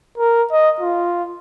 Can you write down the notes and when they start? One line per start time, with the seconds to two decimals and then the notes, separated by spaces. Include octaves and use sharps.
0.17 A#4
0.52 D#5
0.80 F4